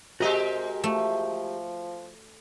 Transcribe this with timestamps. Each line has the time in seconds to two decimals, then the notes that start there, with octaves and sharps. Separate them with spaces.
0.20 C3 G#3 F#4 G4 A#4 D#5
0.84 F3 A3